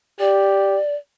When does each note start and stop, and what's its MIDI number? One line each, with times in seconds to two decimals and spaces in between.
0.20 0.79 67
0.20 0.96 74